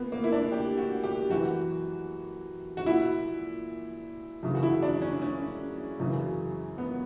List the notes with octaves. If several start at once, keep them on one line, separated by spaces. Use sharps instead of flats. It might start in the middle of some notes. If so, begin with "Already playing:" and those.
Already playing: A#2 A#3 B3
A#3
E4
D4
G4
F#4
G4
F#2 E3 F#4
F#4
A#2 E4
F#2 C#3 E3
F#4
E4
D4
C#4
C#4
F#2 C#3 E3
B3